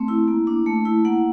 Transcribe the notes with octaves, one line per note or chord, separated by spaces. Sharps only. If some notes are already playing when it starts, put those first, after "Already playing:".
Already playing: A3 C4
E4
A#3
D4
A3
E4
A#3 F#5